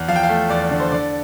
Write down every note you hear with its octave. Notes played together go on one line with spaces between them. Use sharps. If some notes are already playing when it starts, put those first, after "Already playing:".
Already playing: E2
F3 F5
G5
F5
A3
E2 D5
D3
C5
D3 D5